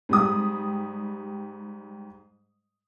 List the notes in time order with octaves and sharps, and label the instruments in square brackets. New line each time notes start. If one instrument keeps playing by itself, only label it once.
[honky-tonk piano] G#2 G3 D#6